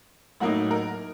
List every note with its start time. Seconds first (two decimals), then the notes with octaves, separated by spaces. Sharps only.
0.40 A2 F#3 A#3 D#4 F#5
0.71 A#4